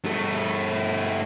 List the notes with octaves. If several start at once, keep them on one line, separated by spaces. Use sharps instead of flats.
G2 A3